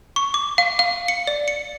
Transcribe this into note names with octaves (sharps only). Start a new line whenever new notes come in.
C#6
D6
F5
F5
C#7
D5
C#7